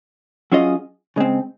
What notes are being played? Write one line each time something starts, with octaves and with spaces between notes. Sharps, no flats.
F#3 C#4 F4 G#4 D#5
C#3 G#3 C4